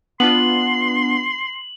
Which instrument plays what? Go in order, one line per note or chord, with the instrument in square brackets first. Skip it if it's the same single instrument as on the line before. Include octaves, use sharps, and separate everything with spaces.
[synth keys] B3 D4 F4 [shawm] C6 [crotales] F#7